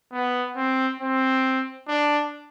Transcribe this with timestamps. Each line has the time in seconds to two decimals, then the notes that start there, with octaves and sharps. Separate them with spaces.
0.12 B3
0.56 C4
1.00 C4
1.88 D4